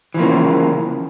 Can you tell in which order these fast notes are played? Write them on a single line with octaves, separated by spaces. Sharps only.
E3 F3 A#3 C#3